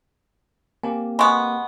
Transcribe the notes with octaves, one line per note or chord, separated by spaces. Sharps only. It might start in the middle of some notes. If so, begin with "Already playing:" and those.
A#3 C4 G4 G#5
G#3 B3 G#5 C6 C#6